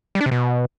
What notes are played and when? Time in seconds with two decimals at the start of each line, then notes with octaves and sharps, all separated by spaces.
0.15 G3
0.21 D4
0.26 C3
0.31 B2